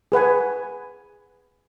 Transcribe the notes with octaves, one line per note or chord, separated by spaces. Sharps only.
G#4 B4 F#5 G#5